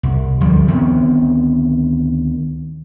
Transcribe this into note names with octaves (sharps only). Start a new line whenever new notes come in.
C2
D2 F3 G3
D2 D#3 B3 C4